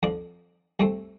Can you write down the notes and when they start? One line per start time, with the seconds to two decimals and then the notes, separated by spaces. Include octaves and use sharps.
0.03 F2 F3 D4
0.80 C2 C3 A3 C4